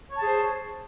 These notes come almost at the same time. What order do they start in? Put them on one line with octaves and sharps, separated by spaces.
C#5 A5 G#4 C5